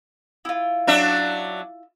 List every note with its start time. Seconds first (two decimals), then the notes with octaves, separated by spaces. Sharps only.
0.45 E4 F4
0.87 F#3 D4 E5